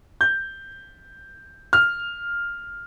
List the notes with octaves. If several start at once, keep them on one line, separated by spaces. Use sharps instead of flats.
G6
F6